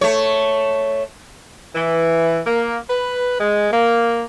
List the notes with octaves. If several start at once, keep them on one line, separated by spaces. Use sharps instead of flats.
A3 C#5
E3
A#3
B4
G#3
A#3